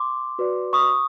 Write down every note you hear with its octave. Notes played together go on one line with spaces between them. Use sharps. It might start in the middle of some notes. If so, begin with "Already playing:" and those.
Already playing: C6 D6
F#4 B4 D5
C#6 D#6